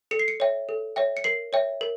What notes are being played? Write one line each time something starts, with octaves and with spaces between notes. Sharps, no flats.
A4 C#7
C7
C#7
C#5 E5 G5
A4
C#5 E5 G5
C#7
A#4 C7
C#5 E5 G5
A#4